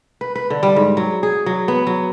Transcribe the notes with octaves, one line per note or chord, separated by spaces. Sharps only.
B4
B4
D3
G3
G#2
F#3
G#4
F#3
B3
F#3